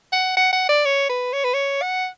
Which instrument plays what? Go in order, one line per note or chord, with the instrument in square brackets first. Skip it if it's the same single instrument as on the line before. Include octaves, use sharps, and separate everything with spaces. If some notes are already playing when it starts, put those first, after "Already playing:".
[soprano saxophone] F#5
F#5
F#5
D5
C#5
B4
C#5
B4
C#5
F#5